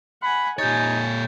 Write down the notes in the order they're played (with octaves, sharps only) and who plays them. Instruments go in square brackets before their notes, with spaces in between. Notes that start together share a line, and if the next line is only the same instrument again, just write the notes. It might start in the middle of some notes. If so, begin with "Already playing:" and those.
[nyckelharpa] F#5 G#5 [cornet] B5
[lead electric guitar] A#2 C#5 [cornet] D#4 [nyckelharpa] G4 G#5 [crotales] G6 A6